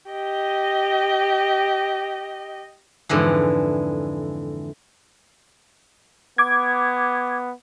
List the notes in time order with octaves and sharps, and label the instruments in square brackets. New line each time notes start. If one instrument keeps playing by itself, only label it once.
[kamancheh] G4 D#5
[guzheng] F2 G#2 D3 E3
[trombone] B3 [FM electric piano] D6 G#6